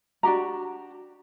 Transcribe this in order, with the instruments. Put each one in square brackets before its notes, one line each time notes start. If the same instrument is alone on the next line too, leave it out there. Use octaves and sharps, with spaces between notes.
[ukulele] D4 F#4 G4 A#5